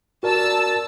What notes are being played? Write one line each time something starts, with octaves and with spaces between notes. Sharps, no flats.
F#4 A#4 D5 A5 E6